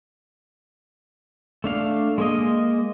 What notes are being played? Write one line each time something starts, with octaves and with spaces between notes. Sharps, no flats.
A3 D4 F5
G#3 A#3 D#5